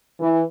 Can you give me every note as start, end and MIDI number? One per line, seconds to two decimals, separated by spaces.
0.20 0.41 52